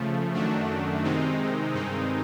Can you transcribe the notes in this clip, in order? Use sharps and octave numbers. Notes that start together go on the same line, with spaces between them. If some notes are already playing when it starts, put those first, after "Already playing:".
Already playing: C#3 F3 A3
F#2 D#3 F#3 A3 D4
C3 D#3 G#3 C4 D#4
G2 D#3 G#3 C4 D#4